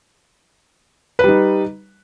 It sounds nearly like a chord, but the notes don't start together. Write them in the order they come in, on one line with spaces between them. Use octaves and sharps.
B4 G3 D#4